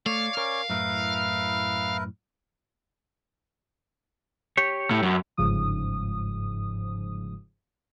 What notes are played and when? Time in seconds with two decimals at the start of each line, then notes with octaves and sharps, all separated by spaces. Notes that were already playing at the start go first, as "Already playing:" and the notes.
0.06 A3 C#5 D5 F5 C#6
0.37 C#4 A#4 C#5 D5
0.69 F#2 A2 E4 A#4 B4
4.57 G4 C#5
4.91 A2
5.03 F#2
5.37 G1 G#2 C#3 F3 D#6